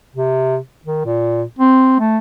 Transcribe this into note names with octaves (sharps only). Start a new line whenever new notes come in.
C3
D#3
A#2
C4
A3